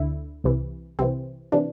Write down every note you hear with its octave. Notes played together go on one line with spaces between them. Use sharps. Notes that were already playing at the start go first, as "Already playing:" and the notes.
Already playing: D2 D3 E4
C2 C3 E3
C2 C3 E3 C4
C3 E3 D4